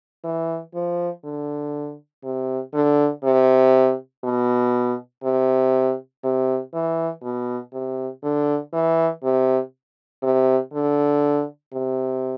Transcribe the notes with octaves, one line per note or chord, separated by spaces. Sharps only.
E3
F3
D3
C3
D3
C3
B2
C3
C3
E3
B2
C3
D3
E3
C3
C3
D3
C3